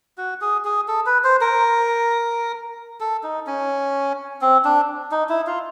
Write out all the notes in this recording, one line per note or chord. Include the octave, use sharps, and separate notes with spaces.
F#4
G#4
G#4
A4
B4
C5
A#4
A4
D#4
C#4
C4
D4
D#4
E4
F4